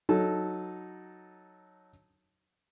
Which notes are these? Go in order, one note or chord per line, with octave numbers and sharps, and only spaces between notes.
F#3 D#4 A4